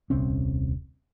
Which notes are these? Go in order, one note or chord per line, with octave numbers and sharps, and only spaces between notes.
D#1 C2 C4 C#4